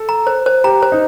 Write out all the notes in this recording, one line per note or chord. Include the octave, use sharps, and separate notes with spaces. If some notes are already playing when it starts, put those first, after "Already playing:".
Already playing: A4
A#5
C5
C5
G4 A#5
C5
D#4